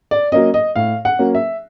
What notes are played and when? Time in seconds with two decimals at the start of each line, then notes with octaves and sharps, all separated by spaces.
0.11 D5
0.32 F#3 A#3 C#4 D#5
0.54 D#5
0.76 A2 F5
1.05 F#5
1.19 F#3 A#3 C#4
1.35 E5